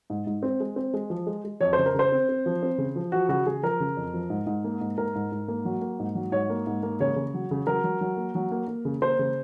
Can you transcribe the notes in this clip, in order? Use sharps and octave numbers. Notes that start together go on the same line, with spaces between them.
G#2
G#2
C4
G#3
C4
G#3
F3
G#3
G#3
F2 C#5
C#3 C5
A#4
C#3 C5
C4
C4
F3
C4
C#3
F3
F3 F#4
C#3 F#4
C#3 G#4
F3 A#4
C#3
F2
F3
G#2
G#2
A#3
G#2
G#2 A#4
G#2
G#2
A#3
F#3
A#3
G#2
F#3
G#2 C#5
A#3
G#2
A#3
C#3 C#5
C#3
F#3
C#3
F#3 A#4
F#3
F#3
A#3
F#3
A#3
A#3
C#3
A#3 C5
C#3